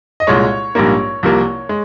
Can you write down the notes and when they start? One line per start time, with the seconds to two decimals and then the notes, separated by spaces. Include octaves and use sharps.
0.20 D#5
0.27 C2 A#2 G#3 C#5
0.75 A#1 G#2 G3 A#3
1.23 C2 C3 F3 A#3
1.69 G#3